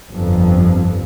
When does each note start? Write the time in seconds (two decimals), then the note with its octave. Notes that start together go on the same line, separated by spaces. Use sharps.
0.11 G1 F2